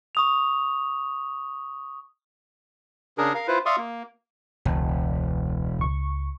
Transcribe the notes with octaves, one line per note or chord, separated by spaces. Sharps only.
C#6 D#6 F7
C#3 D4 G#4 A#4
A#4 F5
E4 F4 B4 C5
D5 E5 F5 C6 C#6 D#6
A#3
E1 C#2
C#2 C#6